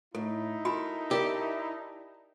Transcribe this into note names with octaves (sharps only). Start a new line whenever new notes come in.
A2 D#4 E4 A4
F#4 A4 A#4 G#5 B5
G4 A#4 D5 E5 A5